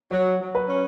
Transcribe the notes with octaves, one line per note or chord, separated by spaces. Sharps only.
F#3 C#5
F#3
B4
C#4